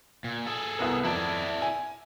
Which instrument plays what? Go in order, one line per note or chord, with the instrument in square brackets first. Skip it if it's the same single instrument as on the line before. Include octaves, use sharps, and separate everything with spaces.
[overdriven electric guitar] A#2
G#4 A4
[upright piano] C2 B3 A#4
[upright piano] F2 [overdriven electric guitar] E4 D5
[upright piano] G#5